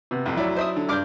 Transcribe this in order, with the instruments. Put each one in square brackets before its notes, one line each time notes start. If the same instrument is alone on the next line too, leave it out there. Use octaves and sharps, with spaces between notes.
[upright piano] C3 B3
[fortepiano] A1 F2
[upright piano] F#3 E4 D5
[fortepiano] C5 E5 D#6
D3
[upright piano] G2 G6 [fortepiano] D5 D6 F6